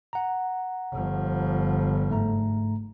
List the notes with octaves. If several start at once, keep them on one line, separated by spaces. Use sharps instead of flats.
F#5 A#5
G1 F3
G#2 A3 A#5